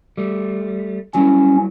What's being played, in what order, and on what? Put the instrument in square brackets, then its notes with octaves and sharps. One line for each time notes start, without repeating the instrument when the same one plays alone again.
[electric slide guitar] G3 A3
[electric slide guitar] F#3 G3 E4 [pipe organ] C#4